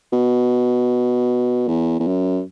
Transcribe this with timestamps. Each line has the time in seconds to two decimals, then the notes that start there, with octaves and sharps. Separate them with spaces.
0.13 B2
1.68 E2
2.00 E2
2.07 F#2